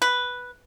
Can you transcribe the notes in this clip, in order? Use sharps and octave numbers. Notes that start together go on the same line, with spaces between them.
B4